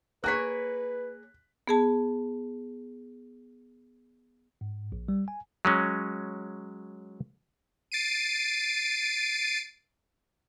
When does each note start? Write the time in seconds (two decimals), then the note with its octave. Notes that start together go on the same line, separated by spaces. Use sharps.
0.24 A#3 G#4 B4 C#5 F#6 B6
1.68 B3 G#4 A5
4.61 G#2
4.92 A#1
5.08 G3
5.28 G#5
5.65 F#3 G#3 C#4
7.92 A6 C7 D7 D#7